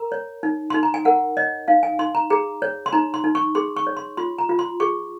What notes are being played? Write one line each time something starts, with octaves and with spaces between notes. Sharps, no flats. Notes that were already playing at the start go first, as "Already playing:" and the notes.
Already playing: A#4 A#5
C#5
D#4
D#4 C6
A#5
G#5
A#4 F#5
C#5 D#5
D#4 F5
G#5
D#4 C6
A#5
G#4 A#5
C#5
C6
D#4 A#5
C6
D#4
C#6
G#4 C6
C#6
C#5
C6
F4 C6
A#5
F4
C6
G#4 C#6